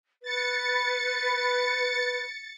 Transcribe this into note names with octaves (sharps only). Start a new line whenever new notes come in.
B4 A6 C#7